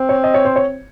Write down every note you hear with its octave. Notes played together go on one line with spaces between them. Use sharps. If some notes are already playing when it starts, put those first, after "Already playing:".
Already playing: C4
C#5
D#5
C#5
C5
C#5